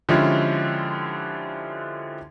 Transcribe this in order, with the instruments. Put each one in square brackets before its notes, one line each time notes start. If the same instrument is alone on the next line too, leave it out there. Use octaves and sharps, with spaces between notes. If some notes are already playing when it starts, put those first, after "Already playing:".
[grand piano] D3 F3 G#3 C#4 E4 G4